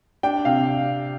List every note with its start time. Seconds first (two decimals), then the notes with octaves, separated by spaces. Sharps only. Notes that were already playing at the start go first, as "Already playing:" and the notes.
0.23 D4 G5
0.45 C3 F5